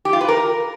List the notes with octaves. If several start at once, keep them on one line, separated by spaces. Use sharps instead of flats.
G4
F4
B4
A#4